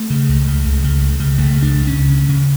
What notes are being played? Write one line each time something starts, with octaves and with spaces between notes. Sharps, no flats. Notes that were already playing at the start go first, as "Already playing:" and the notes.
Already playing: A3
C#3
C#2
C#3
C#2
C#3
C#2
C#3
C#2 A3
C#3
D4
C#2
C#3 C#4
D2
C#3